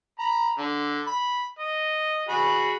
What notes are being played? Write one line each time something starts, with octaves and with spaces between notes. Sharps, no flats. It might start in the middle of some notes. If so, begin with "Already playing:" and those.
A#5 B5
D3
B5
D#5
F#4 G#4 B5